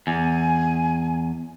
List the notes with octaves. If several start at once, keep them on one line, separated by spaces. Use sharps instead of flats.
E2 G#5